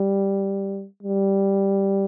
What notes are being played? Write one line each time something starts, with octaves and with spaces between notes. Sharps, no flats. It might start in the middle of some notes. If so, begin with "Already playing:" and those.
Already playing: G3
G3